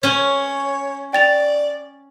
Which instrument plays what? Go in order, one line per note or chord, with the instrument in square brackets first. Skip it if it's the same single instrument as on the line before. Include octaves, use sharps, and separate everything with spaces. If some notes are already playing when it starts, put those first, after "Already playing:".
[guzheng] C#4 G#5 [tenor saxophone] C#5
[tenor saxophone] D5 [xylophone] G5 A6 F7